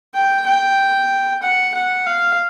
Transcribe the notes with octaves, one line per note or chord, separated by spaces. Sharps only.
G5
G5
F#5
F#5
F5